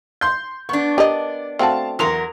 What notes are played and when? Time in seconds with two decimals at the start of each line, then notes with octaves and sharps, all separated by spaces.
0.21 C6 G6
0.69 B3 D4 C#6
0.98 G4 A#4 D5 D#5
1.59 A3 C4 F#4 F5 A5
1.99 E2 F#3 A#4 C6 F7